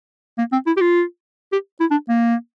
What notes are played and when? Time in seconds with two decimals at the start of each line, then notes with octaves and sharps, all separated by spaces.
0.38 A#3
0.52 C4
0.66 E4
0.77 G4
0.81 F4
1.52 G4
1.80 E4
1.91 D4
2.09 A#3